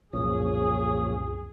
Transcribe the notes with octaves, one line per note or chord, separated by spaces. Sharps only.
C2 F#2 A#2 F3 C#4 G#4 D#6